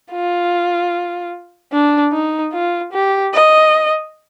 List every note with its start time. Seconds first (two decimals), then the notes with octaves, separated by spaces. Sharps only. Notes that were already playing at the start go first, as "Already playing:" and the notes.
0.12 F4
1.72 D4
2.13 D#4
2.53 F4
2.93 G4
3.33 D#5